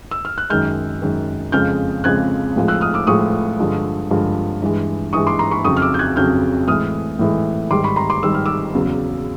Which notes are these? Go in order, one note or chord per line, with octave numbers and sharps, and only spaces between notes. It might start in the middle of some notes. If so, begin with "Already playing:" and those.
E6
F6
F#6
F#2 D#3 G#3 F6 G6
F#2 D#3 G#3
F2 C#3 F3 G#3 F6 G6
F2 C#3 F3 G#3 F#6 G#6
A2 F3 G#3
E6 F#6
D#6 F6
D6 E6
A2 F3 G#3 C#6 D#6
G2 D3 F3 G#3
G2 D3 F3 G#3
G2 E3 G#3
G2 E3 G#3 C#6 D#6
C6 D6
A#5 C6
B5 C#6
F2 C#3 F#3 C#6 D#6
F6
D6 E6
G6
F#6 G#6
F2 C#3 F#3 F6 G6
A2 E3 G#3 D#6 F6
A2 E3 G#3
G#2 D#3 G3 C6 D6
B5 C#6
A#5 C6
C6 D6
G#2 D#3 G3 E6
F6
D6 E6
E2 C#3 F#3